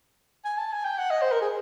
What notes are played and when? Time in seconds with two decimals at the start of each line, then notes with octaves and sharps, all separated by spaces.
0.45 G#5
0.58 A5
0.72 G#5
0.85 G5
0.98 F#5
1.11 D#5
1.22 C5
1.32 A#4
1.42 G#4